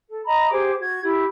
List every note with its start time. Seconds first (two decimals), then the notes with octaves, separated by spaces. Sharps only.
0.09 A4
0.25 D#5 A#5 B5
0.50 G4 G#4 C5 D6
0.79 F#4 G#6
1.02 E4 G4